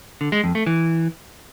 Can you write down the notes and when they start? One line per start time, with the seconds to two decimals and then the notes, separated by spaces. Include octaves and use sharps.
0.21 D3
0.32 G#3
0.44 F2
0.55 A3
0.66 E3